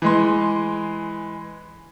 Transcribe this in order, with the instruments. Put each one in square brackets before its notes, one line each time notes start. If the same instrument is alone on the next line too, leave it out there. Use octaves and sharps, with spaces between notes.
[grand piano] E3 G#3 C6